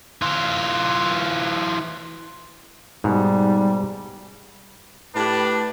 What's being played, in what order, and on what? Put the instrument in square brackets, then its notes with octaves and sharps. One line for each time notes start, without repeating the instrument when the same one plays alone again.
[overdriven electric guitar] E3 F4
[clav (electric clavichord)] G#2 B2 [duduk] G3
[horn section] A2 G4 B4 [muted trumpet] D4